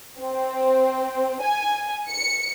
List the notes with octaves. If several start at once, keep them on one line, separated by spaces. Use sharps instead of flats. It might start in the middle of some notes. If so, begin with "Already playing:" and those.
C4
G#5
C#7